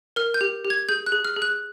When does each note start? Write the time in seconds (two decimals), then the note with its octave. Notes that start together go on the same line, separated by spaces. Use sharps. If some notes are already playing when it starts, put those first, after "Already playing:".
0.16 A#4 F6
0.34 G6
0.41 G4
0.65 G4
0.70 G#6
0.89 G#4 G6
1.06 F#6
1.12 G#4
1.25 F6
1.36 G#4
1.42 F#6